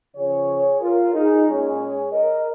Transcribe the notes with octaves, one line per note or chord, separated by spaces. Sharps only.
C#3 F3 C#4 G#4 C#5
F4 A#4
D#4 G#4
A#2 G#3 C#4 G#4 C#5
A#4 D#5